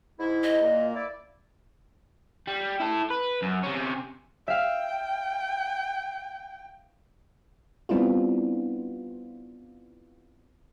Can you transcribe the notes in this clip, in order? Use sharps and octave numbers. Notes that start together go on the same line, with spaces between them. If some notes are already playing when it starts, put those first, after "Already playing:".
G#2 E4
D#5
A#2 A#3
E4 D5
G3
E4 A4
B4
F#2
C3 C#4
E5 F5 G5
G3 B3 C4 D4 E4 F4